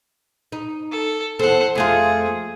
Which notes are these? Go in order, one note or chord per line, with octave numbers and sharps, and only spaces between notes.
D#4
A4
E2 A4 C5 F#5
F2 A3 F4 G#4